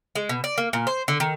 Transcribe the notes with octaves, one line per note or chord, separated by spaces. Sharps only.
G#3
B2
D5
A#3
A#2
C5
D3
D#3